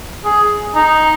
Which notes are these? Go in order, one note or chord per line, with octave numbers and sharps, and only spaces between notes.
G#4
D#4